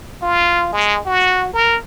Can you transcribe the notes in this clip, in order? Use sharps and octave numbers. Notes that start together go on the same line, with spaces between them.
F4
G#3
F#4
A#4